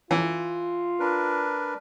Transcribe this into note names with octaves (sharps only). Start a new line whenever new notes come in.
E3 F4
D4 A#4 B4